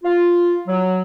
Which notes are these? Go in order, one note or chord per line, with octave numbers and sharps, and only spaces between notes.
F4
F#3